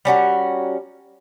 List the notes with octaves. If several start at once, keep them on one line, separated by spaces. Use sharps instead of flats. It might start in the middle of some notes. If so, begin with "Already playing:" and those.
G3 C#4 F#4 A#4